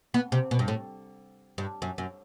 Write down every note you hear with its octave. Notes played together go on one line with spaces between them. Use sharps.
B3
C3
B2
G2
A2
G2
F#2
F#2